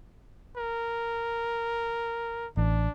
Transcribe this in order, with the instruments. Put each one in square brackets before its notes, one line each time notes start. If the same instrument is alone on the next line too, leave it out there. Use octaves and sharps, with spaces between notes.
[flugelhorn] A#4
[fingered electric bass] A1 [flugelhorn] D4